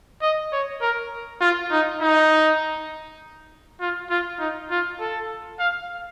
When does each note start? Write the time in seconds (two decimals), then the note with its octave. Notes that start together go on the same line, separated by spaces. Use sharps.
0.22 D#5
0.52 C#5
0.81 A#4
1.41 F4
1.72 D#4
2.01 D#4
3.80 F4
4.10 F4
4.40 D#4
4.71 F4
5.00 A4
5.59 F5